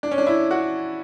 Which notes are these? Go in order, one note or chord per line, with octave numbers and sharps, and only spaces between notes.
D4
C#4
D4
E4
F#4